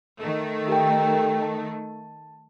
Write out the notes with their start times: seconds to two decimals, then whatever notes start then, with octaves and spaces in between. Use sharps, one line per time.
0.20 D#3 A3
0.68 G4 A#4 G5
1.43 A5